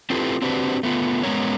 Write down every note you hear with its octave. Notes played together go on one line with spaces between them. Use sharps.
C4 E4 F4 G4 A4 B4
C4 D4 F#4 G4 B4 C5
A3 B3 F4
G#3 B3 C#4 A#4 C#5